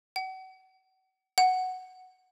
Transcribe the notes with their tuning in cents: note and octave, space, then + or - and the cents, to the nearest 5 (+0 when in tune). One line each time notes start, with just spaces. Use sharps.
F#5 +35
F#5 +5